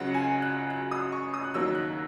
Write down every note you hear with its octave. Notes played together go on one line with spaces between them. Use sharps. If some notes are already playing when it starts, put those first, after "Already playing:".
Already playing: C#2 C#3 F#3 F#5
G#5
F#6
F#6
D#6
C#6
D#6
F#6
D#2 D#3 F#3 A#3 E6
F#6